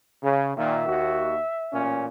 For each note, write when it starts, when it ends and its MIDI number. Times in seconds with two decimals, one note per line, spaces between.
0.23 0.52 49
0.57 0.83 46
0.57 0.83 51
0.57 1.86 76
0.87 1.38 39
0.87 1.38 66
1.73 2.07 33
1.73 2.07 46
1.73 2.07 61